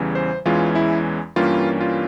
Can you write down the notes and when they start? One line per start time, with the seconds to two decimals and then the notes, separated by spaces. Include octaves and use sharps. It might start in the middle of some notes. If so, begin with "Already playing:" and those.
Already playing: E2 C#3 E3 G3
0.15 C5
0.45 E2 E3 G#3 C#4 F4
0.75 E4
1.36 G2 E3 G3 A#3 C#4 F4
1.81 F4